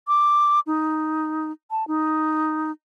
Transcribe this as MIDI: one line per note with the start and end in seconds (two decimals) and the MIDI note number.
0.08 0.60 86
0.67 1.52 63
1.71 1.86 81
1.88 2.71 63